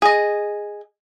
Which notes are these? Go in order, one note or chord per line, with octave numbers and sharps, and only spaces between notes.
G#4 D#5